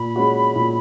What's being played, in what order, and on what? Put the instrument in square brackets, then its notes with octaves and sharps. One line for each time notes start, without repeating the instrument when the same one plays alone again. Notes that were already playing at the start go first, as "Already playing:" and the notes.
Already playing: [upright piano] A#2 [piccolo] B5
[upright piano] G#3 C#4 F#4
A#2